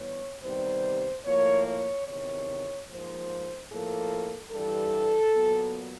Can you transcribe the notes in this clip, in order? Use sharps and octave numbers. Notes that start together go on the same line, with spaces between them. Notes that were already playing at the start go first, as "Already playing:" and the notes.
Already playing: G2 E3 G3 B3 C#5
C3 D#3 G3 B3 C5
A2 F3 A#3 C#5
C#5
E2 C3 D#3 C#5
G#2 F3 A#3 C5
A2 F3 A#3 A4
G2 E3 G3 A4
A#2 F#3 B3